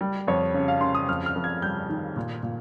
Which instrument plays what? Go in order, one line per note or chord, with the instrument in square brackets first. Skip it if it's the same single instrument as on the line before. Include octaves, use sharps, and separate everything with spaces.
[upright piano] G3
F2 C#5
C#3
F5
C#3 C6
D#6
F2 F6
F6
F2
G#6
G3 G6
D#3
A#2
A#2